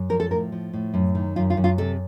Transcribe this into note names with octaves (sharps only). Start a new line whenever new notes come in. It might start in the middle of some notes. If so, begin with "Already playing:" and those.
Already playing: F#2
F3 A#4
A4
A2 A#4
F3
A2
F#2
D#3
F#2 F4
F4
F#2
F4
C3 A4